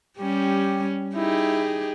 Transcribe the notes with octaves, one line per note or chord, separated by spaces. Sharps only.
G3 C#4 G4
D#4 E4 G4 G#4